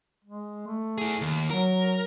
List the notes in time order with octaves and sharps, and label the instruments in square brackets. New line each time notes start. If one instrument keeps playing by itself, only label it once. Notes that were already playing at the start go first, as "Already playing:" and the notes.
[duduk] G#3
A3
[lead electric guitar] E4 G#4
D#2
[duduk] F#3 [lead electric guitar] A#4